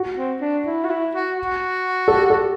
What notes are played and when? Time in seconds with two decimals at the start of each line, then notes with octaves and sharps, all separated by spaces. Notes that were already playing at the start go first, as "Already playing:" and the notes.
Already playing: F#4
0.17 C4
0.41 D4
0.66 E4
0.85 F#4
0.90 E4
1.15 F#4
1.38 F#4
2.08 A4
2.12 G4
2.30 A4